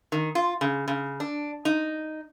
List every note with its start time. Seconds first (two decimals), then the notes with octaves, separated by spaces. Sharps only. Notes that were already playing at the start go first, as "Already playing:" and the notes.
0.12 D#3
0.35 F4
0.61 C#3
0.88 C#3
1.20 D4
1.65 D#4